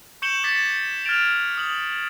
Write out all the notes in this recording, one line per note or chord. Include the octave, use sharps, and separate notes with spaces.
C#6 G6 C#7 E7 F#7 G7
D6 G#6 A6 B6 C#7
F6 G#6 A6 D7 F7
D#6 F#7